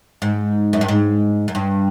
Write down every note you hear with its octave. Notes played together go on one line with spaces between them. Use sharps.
G#2
F#2
G2
G#2
F#2
G2